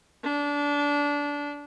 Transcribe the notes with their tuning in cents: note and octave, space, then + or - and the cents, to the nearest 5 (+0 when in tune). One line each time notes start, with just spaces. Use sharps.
D4 -20